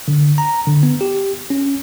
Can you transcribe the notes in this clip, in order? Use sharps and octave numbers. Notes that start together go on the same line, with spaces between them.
D3
A#5
D3
B3
G4
C#4